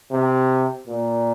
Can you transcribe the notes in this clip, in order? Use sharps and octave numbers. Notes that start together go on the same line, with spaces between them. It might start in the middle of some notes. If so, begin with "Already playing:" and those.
C3
A#2